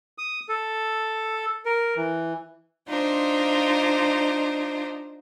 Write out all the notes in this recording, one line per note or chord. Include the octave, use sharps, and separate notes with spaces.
D#6
A4
A#4
E3
D4 D#4 F4 C5